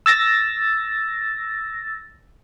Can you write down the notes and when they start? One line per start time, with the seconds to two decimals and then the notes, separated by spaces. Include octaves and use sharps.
0.06 E6 A6 A#6